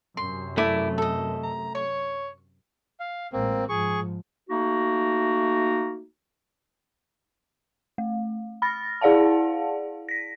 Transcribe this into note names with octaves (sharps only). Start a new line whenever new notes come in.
F#2 C3 C6
A3 E4 D5 D6
A4 D#5
A#5
C#5 C#6
F5
A1 G#3 A#3 C4
G#2 F3 G#4 C#6
A3 A#3 D#4 F#4
A3
B5 F6 A6 A#6
E4 G#4 D5 F5 F#5 A5
A#6 B6